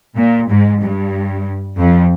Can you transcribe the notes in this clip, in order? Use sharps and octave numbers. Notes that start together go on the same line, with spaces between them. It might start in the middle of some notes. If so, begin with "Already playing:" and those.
A#2
G#2
G2
F2